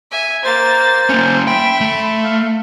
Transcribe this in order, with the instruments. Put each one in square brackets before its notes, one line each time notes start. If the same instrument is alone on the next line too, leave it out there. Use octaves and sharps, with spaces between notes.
[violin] E5 G#5
[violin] A#3 A6 [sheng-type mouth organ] C5
[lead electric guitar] A#3 C#4
[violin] E5 [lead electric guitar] G5 [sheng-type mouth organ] B5 C6
[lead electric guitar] A3
[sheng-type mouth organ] F5